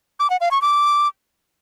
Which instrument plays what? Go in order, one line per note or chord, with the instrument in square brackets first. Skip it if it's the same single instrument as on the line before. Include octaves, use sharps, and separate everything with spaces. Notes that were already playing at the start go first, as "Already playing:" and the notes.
[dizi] D6
F#5
F5
C#6
D6